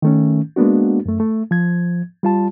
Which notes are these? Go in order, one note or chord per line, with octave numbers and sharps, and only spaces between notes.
D#3 A3 C#4
G#3 A#3 B3 D4 F#4
F#2 A3
A3
F3 G#6
G3 F4 A5